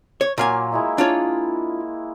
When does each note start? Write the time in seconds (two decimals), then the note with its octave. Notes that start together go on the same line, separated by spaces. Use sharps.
0.21 C#5
0.38 A#2 F#3 A#3 F4 F5 G#5
0.72 G#3 E4 E5
0.98 D4 F4 C#5